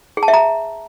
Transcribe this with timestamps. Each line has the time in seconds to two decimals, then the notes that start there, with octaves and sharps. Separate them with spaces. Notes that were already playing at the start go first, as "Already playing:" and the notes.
0.17 G#4
0.23 A5
0.28 E5
0.33 A#5